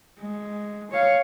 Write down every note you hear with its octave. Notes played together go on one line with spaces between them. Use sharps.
G#3
C#5 F5